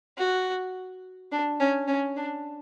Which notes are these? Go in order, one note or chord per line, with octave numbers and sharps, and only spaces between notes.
F#4
D4
C#4
C#4
D4